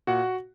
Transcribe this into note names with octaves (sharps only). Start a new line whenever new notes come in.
A#2 F#4 F#5